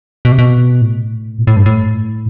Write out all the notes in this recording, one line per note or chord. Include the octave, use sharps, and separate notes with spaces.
B2
C3
B2
A2
B2
A2
G2
A2